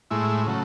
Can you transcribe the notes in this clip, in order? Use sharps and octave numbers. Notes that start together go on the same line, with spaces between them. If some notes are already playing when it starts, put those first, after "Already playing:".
A2 G#3 E4
C#3 F#3 A3